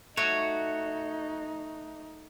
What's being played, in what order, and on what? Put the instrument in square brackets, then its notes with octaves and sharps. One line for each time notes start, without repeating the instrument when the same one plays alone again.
[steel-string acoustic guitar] A3 [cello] D#4 [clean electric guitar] F#4 C#5